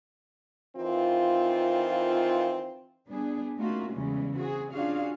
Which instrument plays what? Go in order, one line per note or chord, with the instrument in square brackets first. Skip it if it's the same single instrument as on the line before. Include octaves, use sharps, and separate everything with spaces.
[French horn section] D#3 E3 C4 F4
[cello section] G3 B3 D4 G#4
A3 A#3 C#4 D#4 F4 F#4
E2 C#3 E3 G3 G#3 C#4
C4 F#4 G#4
C#4 D4 F4 F#4 G#4 F5